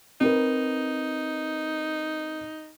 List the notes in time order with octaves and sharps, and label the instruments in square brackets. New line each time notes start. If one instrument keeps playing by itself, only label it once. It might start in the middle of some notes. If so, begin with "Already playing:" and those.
[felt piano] C4 A#4 B4 [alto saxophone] D#4